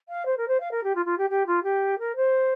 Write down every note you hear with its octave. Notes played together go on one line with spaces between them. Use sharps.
F5
C5
A#4
C5
F5
A#4
G4
F4
F4
G4
G4
F4
G4
A#4
C5